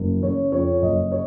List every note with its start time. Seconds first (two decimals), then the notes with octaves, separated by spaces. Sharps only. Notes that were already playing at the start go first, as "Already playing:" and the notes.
Already playing: F#1
0.22 C#3 C#5
0.52 F2 C#5
0.82 F#1 D#5
1.12 C#5